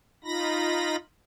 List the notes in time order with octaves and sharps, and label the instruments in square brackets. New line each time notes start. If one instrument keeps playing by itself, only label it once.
[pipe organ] D#4 F4 B5 A#6